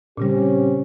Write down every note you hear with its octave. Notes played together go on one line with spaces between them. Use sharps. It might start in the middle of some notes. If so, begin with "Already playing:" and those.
A#2 C#3 G3 C4 C#4 G4